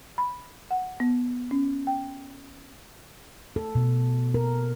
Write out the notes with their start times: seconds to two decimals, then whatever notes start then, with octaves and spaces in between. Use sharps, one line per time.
0.18 B5
0.71 F#5
1.00 B3
1.51 C#4
1.87 G5
3.56 A4
3.75 B2
4.34 A#4